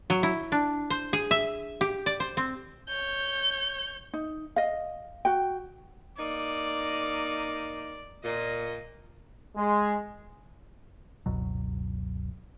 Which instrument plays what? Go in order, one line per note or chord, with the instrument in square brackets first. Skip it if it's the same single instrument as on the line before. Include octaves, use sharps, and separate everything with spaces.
[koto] F#3
E4
D4
C5
G#4
E5
G4
D5
C5
C4
[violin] C#5 G6
[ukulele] D#4
D#5 F5
F#4 G5
[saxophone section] A#3 D#4 [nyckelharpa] D5
[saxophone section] A#2 [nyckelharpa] D#5
[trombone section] G#3
[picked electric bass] F#1 C#2 B2 F#3